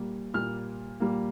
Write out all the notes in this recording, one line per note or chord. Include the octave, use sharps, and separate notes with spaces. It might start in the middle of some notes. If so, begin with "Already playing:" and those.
Already playing: A#2 G3 A#3
A#2 G3 A#3 F6
A#2 G3 A#3